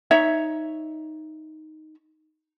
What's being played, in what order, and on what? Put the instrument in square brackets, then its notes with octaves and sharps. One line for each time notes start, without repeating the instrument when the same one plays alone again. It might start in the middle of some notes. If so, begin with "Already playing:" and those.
[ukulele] D#4 C#5 E5